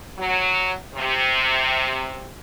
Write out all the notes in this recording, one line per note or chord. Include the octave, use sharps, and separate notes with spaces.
F#3
C3